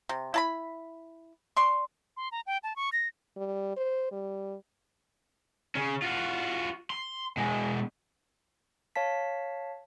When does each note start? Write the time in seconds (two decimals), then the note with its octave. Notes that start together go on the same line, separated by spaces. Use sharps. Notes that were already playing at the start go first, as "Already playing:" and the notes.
0.09 C3
0.34 E4 A5 B5
1.57 D5 C6 C#6
2.17 C6
2.32 A#5
2.47 G5
2.63 A5
2.76 C#6
2.93 A#6
3.37 G3
3.77 C5
4.12 G3
5.75 C#3 C#4
6.02 F4 F#4
6.90 C6
7.37 B2 G#3
8.96 C#5 F5 A5 B6